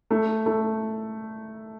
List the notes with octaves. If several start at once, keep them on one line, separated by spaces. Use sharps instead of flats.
A3
A3